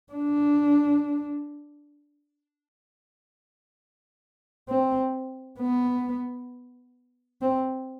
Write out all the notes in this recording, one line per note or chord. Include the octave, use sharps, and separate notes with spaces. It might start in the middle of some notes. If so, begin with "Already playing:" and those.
D4
C4
B3
C4